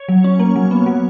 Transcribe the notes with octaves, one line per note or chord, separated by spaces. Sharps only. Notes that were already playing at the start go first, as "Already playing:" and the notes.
Already playing: C#5
F#3
C#4
A#3
F#3
B3
F#3